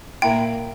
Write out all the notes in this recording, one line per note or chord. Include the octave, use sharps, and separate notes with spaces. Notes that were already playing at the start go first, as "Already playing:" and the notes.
A#2 A#3 E4 G5